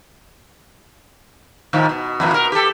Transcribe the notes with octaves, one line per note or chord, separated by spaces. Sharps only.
A2 D#3 F3
B2
F2 A#2 E3
B2 A#4
G4 A4